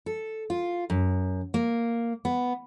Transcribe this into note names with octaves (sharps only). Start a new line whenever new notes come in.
A4
F4
F#2
A#3
B3